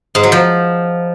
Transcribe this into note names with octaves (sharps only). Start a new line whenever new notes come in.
G#2
F#3
F3